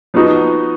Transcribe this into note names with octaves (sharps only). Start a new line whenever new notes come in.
F3 B3 D#4 F#4